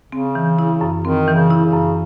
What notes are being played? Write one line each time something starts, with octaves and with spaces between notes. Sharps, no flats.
C#3 C4
E3
E4
F#2
D#3 C4
E3
C#3
E4
C#3
F#2